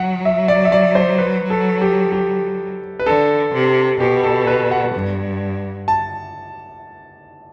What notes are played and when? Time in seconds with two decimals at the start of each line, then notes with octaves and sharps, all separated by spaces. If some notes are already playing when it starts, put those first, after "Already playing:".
Already playing: F#3 F#5
0.25 E5
0.48 D5
0.65 E5
0.72 D5
0.95 C5
1.18 B4
1.50 A4
1.81 G4
2.12 G4
2.99 B4
3.06 D3 A4
3.53 C3
4.00 B2 G4
4.23 A4
4.47 B4
4.71 F#5
4.94 G2
5.88 A5